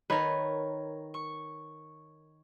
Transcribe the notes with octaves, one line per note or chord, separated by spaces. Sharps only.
D#3 A#4 B4 C#5
C#6